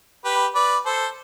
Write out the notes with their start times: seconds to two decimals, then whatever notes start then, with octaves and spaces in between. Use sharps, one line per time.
0.25 G4 B4
0.55 B4 D5
0.86 A4 C5